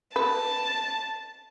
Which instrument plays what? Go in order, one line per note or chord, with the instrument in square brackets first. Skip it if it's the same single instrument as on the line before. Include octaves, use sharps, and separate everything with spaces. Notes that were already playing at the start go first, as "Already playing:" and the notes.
[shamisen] B4 [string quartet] A5